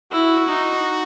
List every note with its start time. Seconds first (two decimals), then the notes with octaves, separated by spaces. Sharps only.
0.12 E4 F#4
0.48 D#4